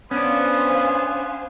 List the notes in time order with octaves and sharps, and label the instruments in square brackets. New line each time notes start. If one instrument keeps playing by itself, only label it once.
[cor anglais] B3 [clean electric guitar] C#4 D4 [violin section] C5 F5 G#5